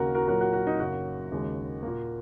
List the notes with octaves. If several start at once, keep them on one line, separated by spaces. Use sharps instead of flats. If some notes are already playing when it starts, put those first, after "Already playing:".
Already playing: D#2 C#3 A#3 F#4 A#4
F#4 A#4
A#2 F#3 A#3 F#4 A#4
F#4
F#4
D#4
F#2 C#3 F#3 A#3 F#4
D#2 C#3 G#3
A#3
A#2